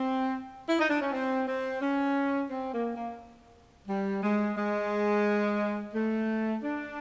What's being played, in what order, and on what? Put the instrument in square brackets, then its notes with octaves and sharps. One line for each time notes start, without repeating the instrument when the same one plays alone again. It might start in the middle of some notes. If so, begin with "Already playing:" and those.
Already playing: [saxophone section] C4
E4
D#4
D4
C#4
C4
C4
C#4
C4
A#3
A#3
G3
G#3
G#3
A3
D4